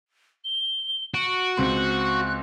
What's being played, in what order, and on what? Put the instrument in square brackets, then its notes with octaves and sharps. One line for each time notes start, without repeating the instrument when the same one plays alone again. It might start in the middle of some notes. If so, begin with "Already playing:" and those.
[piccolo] G7
[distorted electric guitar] F#4 [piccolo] D7
[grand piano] C#2 C4 C6
[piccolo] F#6